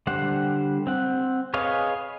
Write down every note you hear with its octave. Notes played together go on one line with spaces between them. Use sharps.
D3 G3 C5 F#5
C4 F#5
G#4 B4 C#5 D#5 F5